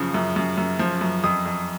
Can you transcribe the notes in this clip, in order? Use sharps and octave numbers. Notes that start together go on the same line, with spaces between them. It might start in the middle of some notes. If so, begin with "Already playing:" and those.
Already playing: F#2 C#3 F3
F#2
F#2
F#2
F3
F#2
F2 D#6
F2